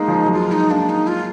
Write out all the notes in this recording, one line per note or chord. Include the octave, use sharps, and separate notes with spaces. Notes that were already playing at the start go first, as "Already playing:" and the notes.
Already playing: G#3 A#3 D#4
F3
F#3
G#3 F4
D#4
A#3 D4
D#4
F4